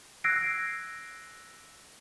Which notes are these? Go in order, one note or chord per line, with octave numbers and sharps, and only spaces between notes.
E6 F#6 G#6 A#6 C7 D7